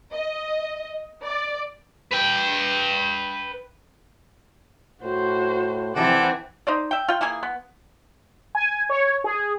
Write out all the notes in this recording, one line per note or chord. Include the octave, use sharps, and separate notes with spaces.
D#5
D5
B4 G5
A2 F#4 C5
C3 E3 C4 A4 D5 F#5 G#5
D#4 C5 D5
E5 G5
F4 G5
E3 A#3 G#4 G#5
B3
G#5
C#5
G#4